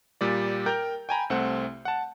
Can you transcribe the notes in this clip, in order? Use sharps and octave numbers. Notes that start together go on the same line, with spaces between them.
A#2 G3 D5
A#4 G5 A#5 G6
G5 G#5 A#5 B5
C2 A3 C4 F#5
F#5 A5